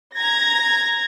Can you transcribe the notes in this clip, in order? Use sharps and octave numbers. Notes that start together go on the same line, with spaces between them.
A#5 G#6 A#6